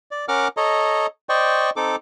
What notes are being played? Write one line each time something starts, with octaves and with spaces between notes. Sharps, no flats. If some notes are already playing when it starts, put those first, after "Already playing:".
D5
C#4 A#4 F#5 D6 F6
A4 C#5 D#5 A#5
C5 D5 D#5 G5 C#6
C4 D#4 A4 D6